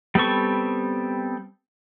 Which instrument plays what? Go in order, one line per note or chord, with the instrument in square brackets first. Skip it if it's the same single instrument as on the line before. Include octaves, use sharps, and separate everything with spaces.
[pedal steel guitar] G3 B3 C4 A4 C#6